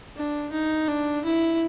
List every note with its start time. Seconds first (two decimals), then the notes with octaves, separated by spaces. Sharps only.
0.16 D4
0.52 D#4
0.88 D4
1.25 E4